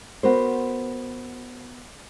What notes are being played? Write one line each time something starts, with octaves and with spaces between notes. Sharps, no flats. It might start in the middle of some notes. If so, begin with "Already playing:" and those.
B3 F#4 A#4 C5